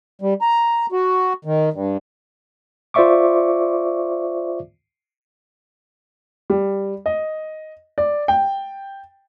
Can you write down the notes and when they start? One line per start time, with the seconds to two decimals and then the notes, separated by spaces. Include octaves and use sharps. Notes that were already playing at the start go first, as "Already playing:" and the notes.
0.22 G3
0.41 A#5
0.92 F#4
1.45 D#3
1.73 G2
2.94 F4 C5 D5 E5 C#6 D6
6.50 G3
7.06 D#5
7.98 D5
8.28 G5